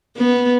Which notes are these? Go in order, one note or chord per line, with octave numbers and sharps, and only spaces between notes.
B3